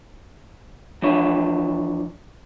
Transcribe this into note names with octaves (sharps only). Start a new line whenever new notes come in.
E3 F3 D4 C#5